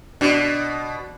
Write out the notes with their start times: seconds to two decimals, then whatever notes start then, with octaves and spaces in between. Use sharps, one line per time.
0.21 B2 D4